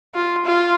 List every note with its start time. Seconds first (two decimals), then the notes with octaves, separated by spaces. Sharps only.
0.15 F4
0.45 F4